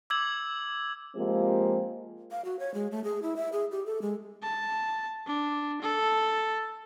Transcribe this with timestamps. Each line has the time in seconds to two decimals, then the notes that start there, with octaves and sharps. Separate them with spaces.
0.10 D6 E6 G#6 F#7
1.15 F3 G#3 A#3 C4 G4
2.31 F5
2.45 F#4
2.59 C#5
2.74 G#3
2.91 A3
3.04 G#4
3.22 E4
3.36 E5
3.52 G#4
3.72 G4
3.86 A4
4.02 G#3
4.42 A5
5.26 D4
5.82 A4